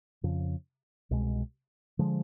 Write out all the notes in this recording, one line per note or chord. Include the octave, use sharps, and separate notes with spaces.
F2 C#3 F3
C2 B2 G#3
D3 F3 G#3